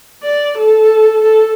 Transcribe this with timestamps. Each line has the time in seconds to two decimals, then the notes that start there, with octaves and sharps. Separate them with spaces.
0.23 D5
0.58 A4
1.22 A4